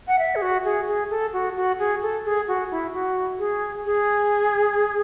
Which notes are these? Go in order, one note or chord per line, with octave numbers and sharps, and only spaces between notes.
F#5
E5
G#4
F#4
G#4
G#4
A4
F#4
F#4
G#4
A4
G#4
F#4
E4
F#4
G#4
G#4